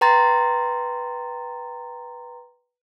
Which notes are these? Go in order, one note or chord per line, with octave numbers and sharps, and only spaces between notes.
B4 G5 A#5 C6 A6